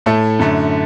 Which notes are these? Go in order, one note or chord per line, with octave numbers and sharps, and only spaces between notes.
A2 A3 E4 A4
F#2 D3 A3